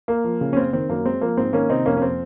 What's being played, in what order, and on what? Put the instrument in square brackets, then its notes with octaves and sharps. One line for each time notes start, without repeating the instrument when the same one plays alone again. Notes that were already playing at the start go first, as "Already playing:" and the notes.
[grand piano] A#3
F3
C#3
C#4
F#1 C4
D#3 C4
F#2 A#3
G#3 C4
F3 A#3
G#2 C4
D#3 A#3 C#4
C3 C4 D#4
F2 A#3 C#4
C#4
C4